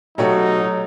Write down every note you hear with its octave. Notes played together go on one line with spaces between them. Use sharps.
B2 F#3 A3 D#4 F#4 G4 C#5